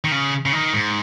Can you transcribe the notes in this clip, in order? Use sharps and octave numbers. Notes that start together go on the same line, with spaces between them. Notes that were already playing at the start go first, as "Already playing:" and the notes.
D#3
C#3
C#3
D#3
G#2